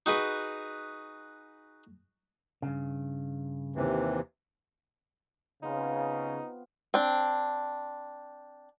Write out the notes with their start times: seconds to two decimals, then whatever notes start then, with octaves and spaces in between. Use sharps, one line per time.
0.06 D#4 F#4 G#4 B4
2.62 G2 C#3
3.76 D#2 C3 E3
5.63 C#3 B3 C4 D#4 F4
6.94 C4 D4